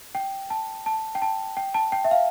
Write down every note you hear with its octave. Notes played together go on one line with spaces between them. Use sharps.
G5
A5
A5
G5
A5
G5
A5
G5
E5
F5